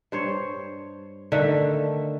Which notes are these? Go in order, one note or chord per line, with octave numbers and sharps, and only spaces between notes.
G2 C5 C#5
D3 D#3 A3 E5